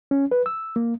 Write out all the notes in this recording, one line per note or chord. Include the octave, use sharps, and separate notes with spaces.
C#4
B4
E6
A#3